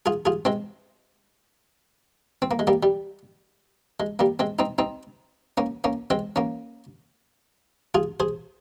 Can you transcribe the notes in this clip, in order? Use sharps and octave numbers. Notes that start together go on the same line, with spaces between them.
F4 G#4
F4 G#4
G#3 C4
C4
A#3
G#3
G3 A#3
G3
G#3
G3 A#3
G#3 C4
C4 D#4
C4 D#4
A#3 C#4
A#3 C#4
G#3 C4
A#3 C#4
F4 G#4
G#4 C5